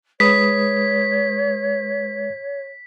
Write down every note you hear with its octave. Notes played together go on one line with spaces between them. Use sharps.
G#3 B4 C#5 D#6 B6